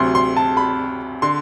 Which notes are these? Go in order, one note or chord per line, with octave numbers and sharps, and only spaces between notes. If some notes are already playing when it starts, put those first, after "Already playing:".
Already playing: D2 C3 F#3 C6
C6
A5
B5
D3 C6